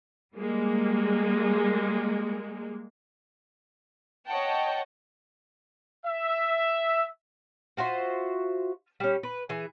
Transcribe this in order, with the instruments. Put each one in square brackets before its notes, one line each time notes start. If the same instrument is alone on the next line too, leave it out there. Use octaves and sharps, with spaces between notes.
[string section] G3 G#3 A#3
[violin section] C#5 D#5 F#5 G5 A5
[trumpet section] E5
[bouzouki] F4 F#4 C5 E5
G3 C#4
B4
E3 G#4